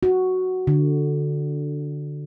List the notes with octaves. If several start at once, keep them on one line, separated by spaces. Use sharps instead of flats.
F#4
D3